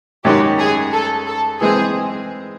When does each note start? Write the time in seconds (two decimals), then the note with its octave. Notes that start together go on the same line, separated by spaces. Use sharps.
0.24 F#2 D#3 G#3 C#4 F#4 G4
0.58 G#4
0.93 A4
1.27 A4
1.61 E3 G#3 C4 G#4